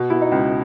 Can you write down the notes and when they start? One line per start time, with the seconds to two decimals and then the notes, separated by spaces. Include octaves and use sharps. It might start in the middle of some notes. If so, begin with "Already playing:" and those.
Already playing: B2
0.10 B2 E4
0.22 D#4
0.32 C#2